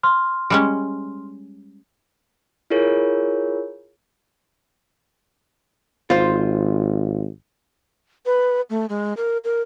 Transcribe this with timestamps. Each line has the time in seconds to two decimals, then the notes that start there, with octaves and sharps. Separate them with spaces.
0.03 C6 F6
0.50 G3 G#3 C#4
2.70 E4 F4 G#4 A#4 C#5
6.10 G#1 F4 C5
8.26 B4
8.70 A3
8.89 G#3
9.17 A#4
9.44 A#4